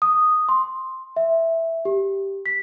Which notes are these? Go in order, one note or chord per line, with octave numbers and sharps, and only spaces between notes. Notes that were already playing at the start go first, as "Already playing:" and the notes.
D#6
C6
E5
G4
B6